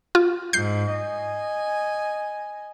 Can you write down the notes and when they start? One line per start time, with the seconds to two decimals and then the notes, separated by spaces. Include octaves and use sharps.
0.15 F4
0.53 G#2 G6 C7
0.93 D#5 G#5